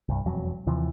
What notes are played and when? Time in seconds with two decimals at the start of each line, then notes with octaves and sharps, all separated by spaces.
0.09 C2 G2
0.26 E1 F2 F#3
0.67 D#2 C3 E3 F3